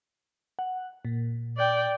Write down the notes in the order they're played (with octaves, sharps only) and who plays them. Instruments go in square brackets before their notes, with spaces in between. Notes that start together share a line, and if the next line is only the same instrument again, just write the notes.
[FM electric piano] F#5
A#2
[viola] D5 G5